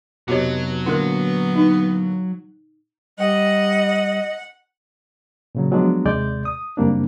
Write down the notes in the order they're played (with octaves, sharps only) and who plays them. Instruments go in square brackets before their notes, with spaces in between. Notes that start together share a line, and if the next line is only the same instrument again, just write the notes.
[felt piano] F1 B3 D#5 [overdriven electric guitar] F#3 [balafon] F#4 G4 C#5
[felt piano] A#2 D3 [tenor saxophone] B3 [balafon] E4 A#4
[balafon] D#4
[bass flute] G3 [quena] D#5 [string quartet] F#5
[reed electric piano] A#2 C#3 F#3
F3 F#3 G#3 B3 D4
D#2 C3 G#3 D5 G6
D#6
F#2 C#3 G3 A#3 C4 D4